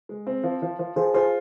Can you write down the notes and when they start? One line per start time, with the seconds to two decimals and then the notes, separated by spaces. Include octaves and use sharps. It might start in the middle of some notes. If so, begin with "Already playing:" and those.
0.09 G#3
0.27 C4
0.43 F3
0.62 F3
0.79 F3
0.96 F3 G#4 C5
1.14 F4 G#4 C5